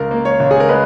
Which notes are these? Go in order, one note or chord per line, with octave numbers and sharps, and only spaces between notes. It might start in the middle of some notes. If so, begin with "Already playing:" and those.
Already playing: C#2 A#4
A#3
C#5
C#2
G#4
A#4
G#3 B4